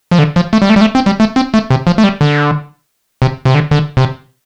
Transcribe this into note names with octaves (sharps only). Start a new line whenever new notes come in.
F3
D3
F3
A3
G3
A3
G3
A3
C4
G3
A3
C4
A3
C3
F3
A3
G3
D3
C3
C3
D3
D3
C3